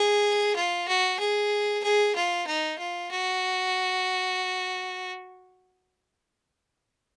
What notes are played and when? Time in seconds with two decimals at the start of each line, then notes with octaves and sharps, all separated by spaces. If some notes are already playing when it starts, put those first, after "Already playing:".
Already playing: G#4
0.55 F4
0.88 F#4
1.19 G#4
1.83 G#4
2.15 F4
2.47 D#4
2.78 F4
3.11 F#4